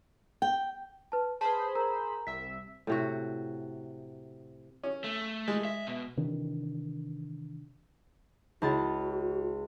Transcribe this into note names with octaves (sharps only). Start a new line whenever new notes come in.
G5
B4 A5
G#4 B4 C5 A5 B5
A#4 A#5
C2 E5 B6
A2 C3 F#4
C#4
A3
G#3
E5
B2
C3 D#3 E3 D4
C#2 E4 F#4 A6